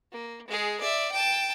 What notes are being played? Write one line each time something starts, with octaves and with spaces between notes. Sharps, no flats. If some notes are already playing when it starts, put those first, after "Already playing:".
A#3
G#3 G#4
D5 E5
G5 A5